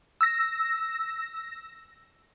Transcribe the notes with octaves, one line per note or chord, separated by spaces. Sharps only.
E6 A#6